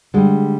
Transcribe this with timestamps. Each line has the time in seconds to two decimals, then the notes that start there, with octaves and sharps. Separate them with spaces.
0.14 D3 G3 G#3